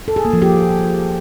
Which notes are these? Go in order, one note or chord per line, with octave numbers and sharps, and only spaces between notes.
A4
G#4
A#3
F3
G4